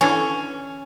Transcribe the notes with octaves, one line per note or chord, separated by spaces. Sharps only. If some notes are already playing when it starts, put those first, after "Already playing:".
D3 E3 C#4 C#5 G#5